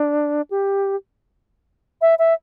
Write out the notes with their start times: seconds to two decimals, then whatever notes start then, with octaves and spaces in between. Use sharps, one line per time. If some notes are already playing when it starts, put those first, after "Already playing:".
Already playing: D4
0.51 G4
2.02 E5
2.19 E5